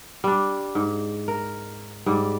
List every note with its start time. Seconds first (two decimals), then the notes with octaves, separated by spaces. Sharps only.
0.24 G3 D4
0.75 G#2
1.28 A#4
2.06 G#2 G3